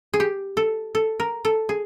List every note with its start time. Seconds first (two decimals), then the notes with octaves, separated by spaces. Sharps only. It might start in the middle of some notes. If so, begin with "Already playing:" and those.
0.14 G#4
0.20 G4
0.57 A4
0.95 A4
1.20 A#4
1.45 A4
1.69 G#4